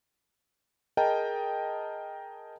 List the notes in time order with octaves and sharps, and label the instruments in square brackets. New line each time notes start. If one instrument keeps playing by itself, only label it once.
[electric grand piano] G#4 A#4 D#5 G5 A5 A#5